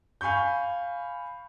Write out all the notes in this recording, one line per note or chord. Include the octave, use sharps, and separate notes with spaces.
F5 G#5 B5 C#6 G6